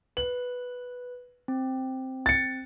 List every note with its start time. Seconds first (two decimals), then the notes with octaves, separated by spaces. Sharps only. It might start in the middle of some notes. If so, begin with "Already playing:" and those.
0.17 B4 F#7
1.48 C4
2.26 A6 C#7